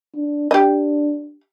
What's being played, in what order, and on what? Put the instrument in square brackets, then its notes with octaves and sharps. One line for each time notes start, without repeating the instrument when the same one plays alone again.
[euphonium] D4
[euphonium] D4 [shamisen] G4 D#5